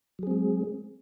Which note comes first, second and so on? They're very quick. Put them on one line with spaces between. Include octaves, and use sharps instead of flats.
F#3 G#4 C4 G#3